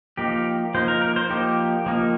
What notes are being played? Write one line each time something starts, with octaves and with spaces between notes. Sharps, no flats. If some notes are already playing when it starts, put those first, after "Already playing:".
F3 A#3 D#4 G4
F3 A#3 D#4 C5
A#4
A#4
C5
F3 A#3 D#4 G4
F3 A#3 D#4